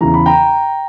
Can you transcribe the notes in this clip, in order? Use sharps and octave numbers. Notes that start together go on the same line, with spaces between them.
E2 C#3 E3 A#5
B5
G5 A#5